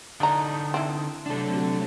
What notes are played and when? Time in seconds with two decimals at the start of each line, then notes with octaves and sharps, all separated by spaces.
0.20 D3 E3 D4 D#4 A#5
0.74 C4 E4
1.26 C3 F#3 A3 D4 A4